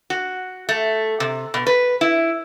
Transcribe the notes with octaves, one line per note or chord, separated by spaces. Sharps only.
F#4
A3
C3
B2
B4
E4